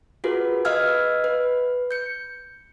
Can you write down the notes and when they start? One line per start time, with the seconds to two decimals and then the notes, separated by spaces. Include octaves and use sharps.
0.24 F4 F#4 G#4 A#4 B4
0.65 B4 D#5 F5 E6 F6 G#6
1.24 B4
1.91 G6 C#7